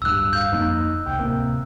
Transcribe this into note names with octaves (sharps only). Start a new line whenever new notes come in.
D1 G2 E6 F#6
F5 G6
F2 A#3 D#4
C2 G5
D1 G#1 C3 A#3